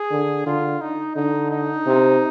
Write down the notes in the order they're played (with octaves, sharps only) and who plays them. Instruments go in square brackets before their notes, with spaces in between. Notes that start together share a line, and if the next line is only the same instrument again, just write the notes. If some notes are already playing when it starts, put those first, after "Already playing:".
Already playing: [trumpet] G#4
[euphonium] D3
[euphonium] D3 [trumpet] F4
[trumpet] D#4
[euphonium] D3 [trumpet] D#4
[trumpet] D#4
[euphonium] C3